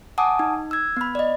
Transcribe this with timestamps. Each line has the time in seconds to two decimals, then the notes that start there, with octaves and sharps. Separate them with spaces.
0.18 F#5 G#5 A5 D6 D#6
0.39 D#4
0.71 E6 G#6
0.97 B3 B5
1.15 D5 D#5